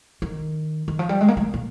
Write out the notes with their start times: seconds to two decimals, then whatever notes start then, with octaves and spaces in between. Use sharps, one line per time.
0.22 D#3
0.88 D#3
0.99 F3
1.09 G3
1.21 G#3
1.28 A#3
1.37 G#3
1.45 C3
1.54 A#2